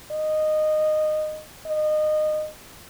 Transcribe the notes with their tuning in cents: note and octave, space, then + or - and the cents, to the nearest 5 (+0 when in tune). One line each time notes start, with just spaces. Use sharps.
D#5 -15
D#5 -25